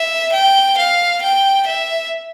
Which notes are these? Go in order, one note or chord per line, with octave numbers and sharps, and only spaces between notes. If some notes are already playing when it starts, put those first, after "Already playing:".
Already playing: E5
G5
F5
G5
E5